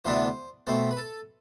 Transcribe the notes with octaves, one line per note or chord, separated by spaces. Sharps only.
D2 C3 E3 B3 D4 C5
B2 A3 C4 C5
B4
A4